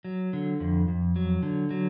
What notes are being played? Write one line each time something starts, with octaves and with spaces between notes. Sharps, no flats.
F#3
D3
F2
F2
F#3
D3
F#3